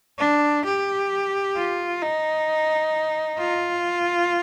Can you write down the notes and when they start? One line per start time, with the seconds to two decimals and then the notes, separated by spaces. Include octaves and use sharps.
0.19 D4
0.65 G4
1.57 F4
2.02 D#4
3.39 F4